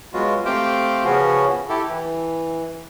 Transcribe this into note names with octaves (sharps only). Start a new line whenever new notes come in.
F#3 G#3 B3 F4 F#4
A3 C4 G4 C5 F5 G5
C#3 F3 B3 C#4 F#4
E4 G4 A4
E3